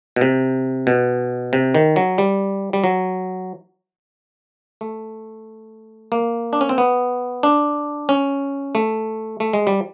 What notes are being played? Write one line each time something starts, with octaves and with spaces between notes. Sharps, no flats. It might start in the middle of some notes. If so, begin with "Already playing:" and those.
B2
C3
B2
C3
D#3
F#3
G3
G3
F#3
A3
A#3
D4
C#4
C4
B3
D4
C#4
A3
A3
G#3
G3